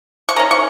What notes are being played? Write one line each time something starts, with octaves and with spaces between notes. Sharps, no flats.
C#6
D#3 C#4 A#5
C#6